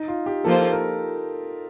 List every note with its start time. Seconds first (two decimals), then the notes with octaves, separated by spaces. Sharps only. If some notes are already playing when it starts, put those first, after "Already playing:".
Already playing: D#4
0.08 F4
0.26 G4
0.44 F3 A#3 F4 A4 C5
0.72 A#4